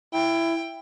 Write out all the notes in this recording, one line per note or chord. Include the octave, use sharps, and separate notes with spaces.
E4 G5